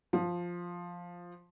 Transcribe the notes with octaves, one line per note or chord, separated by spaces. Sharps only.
F3